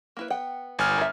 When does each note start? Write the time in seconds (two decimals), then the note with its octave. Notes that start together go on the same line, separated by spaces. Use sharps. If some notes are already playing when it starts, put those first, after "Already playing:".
0.17 A#3 E4 B4
0.30 B3 F#5 G5
0.79 G1 G#5 F6
0.98 A#4 E5